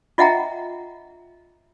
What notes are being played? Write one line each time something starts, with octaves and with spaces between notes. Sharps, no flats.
F4 D#5 E5 F#5 G5 A#5